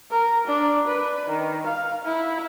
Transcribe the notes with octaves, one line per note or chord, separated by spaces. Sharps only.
A#4
D4
B4
D#3
F5
E4